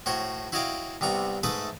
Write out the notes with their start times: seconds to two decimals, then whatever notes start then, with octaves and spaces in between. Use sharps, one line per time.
0.06 A2 F#4 C5 C#5 C6
0.52 E4 F#4 C#5 D#5 F5 G5
1.01 C2 C3 B3 A#5 C#6
1.43 G#2 A3 A4 B4 E5 D#6